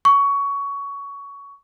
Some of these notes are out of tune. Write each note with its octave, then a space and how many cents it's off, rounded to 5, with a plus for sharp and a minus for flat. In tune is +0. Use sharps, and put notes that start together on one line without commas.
C#6 +15